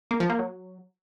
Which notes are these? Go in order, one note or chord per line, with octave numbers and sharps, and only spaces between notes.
A#3
F3
A#3
F#3